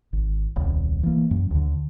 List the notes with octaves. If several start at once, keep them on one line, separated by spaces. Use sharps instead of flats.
G#1
D#1 C2
E3 A#3
F#2
D2 D3